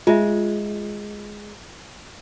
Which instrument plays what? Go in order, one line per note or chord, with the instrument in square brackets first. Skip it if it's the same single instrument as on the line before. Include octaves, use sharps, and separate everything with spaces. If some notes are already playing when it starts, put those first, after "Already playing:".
[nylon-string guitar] G#3 [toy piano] F4 E5